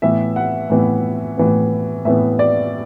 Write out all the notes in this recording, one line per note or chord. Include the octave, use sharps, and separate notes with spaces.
A2 E3 B3 E5
F#5
A2 E3 B3
A2 E3 B3
A2 E3 B3 E5
D5